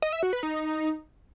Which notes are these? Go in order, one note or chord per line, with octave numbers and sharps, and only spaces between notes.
D#5
E5
F#4
B4
D#4